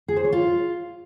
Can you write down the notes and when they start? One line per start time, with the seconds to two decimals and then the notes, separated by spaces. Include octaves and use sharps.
0.08 G#4
0.16 C5
0.24 C#5
0.32 F4